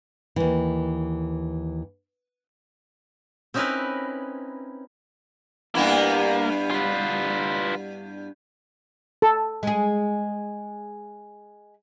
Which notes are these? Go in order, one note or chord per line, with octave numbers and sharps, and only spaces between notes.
D#2 E3
C4 C#4 D#4 E4 A#4 B4
G2 A#3 B3 E4
F4 B4
A4
G#3 G#4